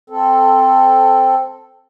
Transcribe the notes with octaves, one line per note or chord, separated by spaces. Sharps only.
C4 A4